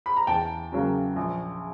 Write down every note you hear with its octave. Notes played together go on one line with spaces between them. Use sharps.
B5
A#5
E2 G5 A5
C#3 F#3 A#3
A#1